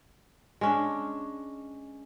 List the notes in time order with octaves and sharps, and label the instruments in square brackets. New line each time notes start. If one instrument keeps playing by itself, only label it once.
[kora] G#3 C#4 D4